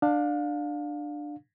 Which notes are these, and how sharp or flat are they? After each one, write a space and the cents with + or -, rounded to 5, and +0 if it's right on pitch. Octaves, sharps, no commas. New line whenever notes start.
D4 +15 F5 +25